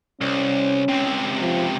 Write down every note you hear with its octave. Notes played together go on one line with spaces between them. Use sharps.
C2 C#4
C#2 C3
F3